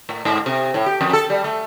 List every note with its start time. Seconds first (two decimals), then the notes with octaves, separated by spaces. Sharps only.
0.09 A2
0.25 G#2
0.46 C3
0.74 A2
0.86 G4
1.01 F2
1.13 A4
1.30 G3
1.44 A3